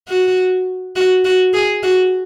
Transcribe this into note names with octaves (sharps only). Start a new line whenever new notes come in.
F#4
F#4
F#4
G#4
F#4